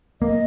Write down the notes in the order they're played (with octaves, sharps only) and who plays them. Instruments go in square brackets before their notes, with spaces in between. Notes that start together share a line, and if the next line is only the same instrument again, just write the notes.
[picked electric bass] A#3 [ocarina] D#5